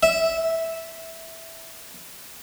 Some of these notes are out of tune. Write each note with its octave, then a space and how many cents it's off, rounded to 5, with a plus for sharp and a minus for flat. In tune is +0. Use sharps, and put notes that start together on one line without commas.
E5 -10